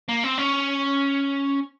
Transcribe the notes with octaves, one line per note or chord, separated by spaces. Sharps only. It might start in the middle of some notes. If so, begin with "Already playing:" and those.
A#3
C4
C#4